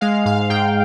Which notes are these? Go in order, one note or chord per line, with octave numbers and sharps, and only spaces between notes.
G#3 F5
G#2 F5
G#2 G5